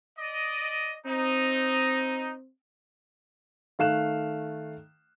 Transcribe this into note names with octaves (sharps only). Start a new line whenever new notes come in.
D5 D#5
C4 D#4
D#3 A3 F5 F#6 E7